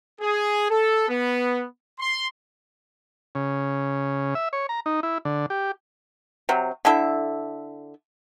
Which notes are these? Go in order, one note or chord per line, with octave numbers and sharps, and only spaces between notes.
G#4
A4
B3
C6
C#3
E5
C#5
A#5
D#4
E4
D3
G4
C3 F#3
D3 E4 A4 E5